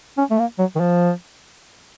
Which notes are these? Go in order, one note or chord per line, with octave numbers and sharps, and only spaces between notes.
C#4
A3
A#3
F#3
D#3
F3